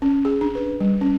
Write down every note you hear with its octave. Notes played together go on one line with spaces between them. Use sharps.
C#4
G#4
D4
B4
G3
C#4